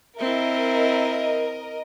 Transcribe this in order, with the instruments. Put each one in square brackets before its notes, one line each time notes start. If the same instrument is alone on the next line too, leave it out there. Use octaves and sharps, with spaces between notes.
[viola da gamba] C4 E4 [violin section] A#4 D#5 [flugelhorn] E5